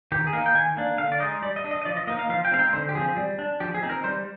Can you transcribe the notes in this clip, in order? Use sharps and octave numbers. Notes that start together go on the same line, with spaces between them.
D#3 G4
G#4
A#3 D#4 A#4
G5
D#3 G#5
A#3 D4
D3 F5
D5
G#3 D#4 D#5
G3 D5
D#5
D4
D#5
D#5
F3 D5
D#5
A#3 D#4 D#5
F5
F3 F5
G5
G#3 C4 D#4 F5
G5
D3 C5
G4
F3 C4 G#4
G3
D4
F3 G4
G#4
C4 D#4
A#4
G3 C5